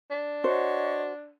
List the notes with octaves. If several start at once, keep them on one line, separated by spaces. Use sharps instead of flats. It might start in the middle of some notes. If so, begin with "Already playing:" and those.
D4
F#4 C5 C#5 D#5 C#6